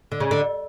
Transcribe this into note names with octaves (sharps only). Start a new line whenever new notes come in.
D3
C#3
D3